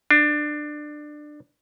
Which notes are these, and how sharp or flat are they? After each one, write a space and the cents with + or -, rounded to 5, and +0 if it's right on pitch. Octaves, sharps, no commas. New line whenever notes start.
D4 +20